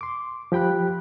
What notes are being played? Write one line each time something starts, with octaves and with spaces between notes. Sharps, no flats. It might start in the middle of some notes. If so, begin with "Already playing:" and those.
C6 D6
F3 G4 G5 B5 F#6